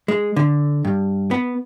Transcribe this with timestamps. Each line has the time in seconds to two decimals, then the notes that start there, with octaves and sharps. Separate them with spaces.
0.08 G#3
0.36 D3
0.85 G2
1.31 B3